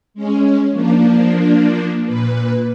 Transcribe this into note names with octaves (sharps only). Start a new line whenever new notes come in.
G#3 C#4
F3 A#3 D4
A#2 B4